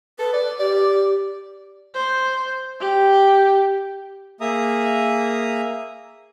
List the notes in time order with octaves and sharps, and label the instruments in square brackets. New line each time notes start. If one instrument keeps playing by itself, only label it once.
[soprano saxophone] A4 [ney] B4
[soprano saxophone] D5
[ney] G4 [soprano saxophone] D5
[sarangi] C5
G4
[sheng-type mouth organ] A#3 G#4 E5 A#5 D#6